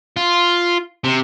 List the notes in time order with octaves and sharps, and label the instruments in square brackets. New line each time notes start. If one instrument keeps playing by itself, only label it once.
[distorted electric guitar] F4
C3